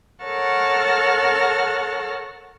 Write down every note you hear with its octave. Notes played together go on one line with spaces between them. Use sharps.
A4 A#4 C#5 F#5 A5 F6